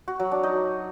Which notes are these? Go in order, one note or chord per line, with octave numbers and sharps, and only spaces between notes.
F#4
F#3
D4
D#4